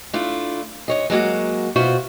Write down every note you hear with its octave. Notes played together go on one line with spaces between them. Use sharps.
A3 D4 E4 F4
D2 C#5 D#5
F#3 G#3 A#3 F#4
B2 F4 F#4 C5 E5